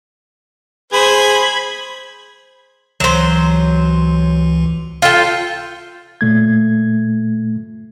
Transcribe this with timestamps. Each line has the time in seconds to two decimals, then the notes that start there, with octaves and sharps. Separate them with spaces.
0.93 G#4 C5 B5 G#6
3.00 C#2 E3 F#3 C5
5.02 F4 A4 G5
6.21 A#2 A3 G#6